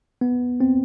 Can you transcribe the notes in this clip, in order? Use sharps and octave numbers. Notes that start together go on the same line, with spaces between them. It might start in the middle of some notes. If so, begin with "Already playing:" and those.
B3
C4